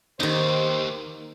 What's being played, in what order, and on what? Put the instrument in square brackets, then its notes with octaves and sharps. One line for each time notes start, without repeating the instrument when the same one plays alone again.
[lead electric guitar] D#2 [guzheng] D#3 D#4 [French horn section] G4 C5